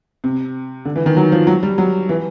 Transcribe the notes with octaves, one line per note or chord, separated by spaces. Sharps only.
C3
D3
E3
D#3
F#3
F3
F#3
G3
F#3
E3